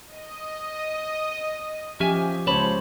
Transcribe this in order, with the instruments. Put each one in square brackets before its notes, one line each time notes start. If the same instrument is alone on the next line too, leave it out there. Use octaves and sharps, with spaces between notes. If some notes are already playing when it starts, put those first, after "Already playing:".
[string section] D#5
[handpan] F3 G4 [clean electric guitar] C#4 E5 G#5
[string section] C#2 [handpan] C#4 C5 C#5 [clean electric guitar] A5 B5